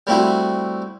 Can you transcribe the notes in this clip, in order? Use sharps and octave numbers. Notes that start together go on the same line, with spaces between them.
G3 A3 C4 E4 F#4